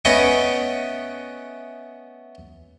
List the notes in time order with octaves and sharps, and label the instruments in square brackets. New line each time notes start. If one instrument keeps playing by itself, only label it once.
[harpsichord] A3 B3 C#4 B4 D#5 G5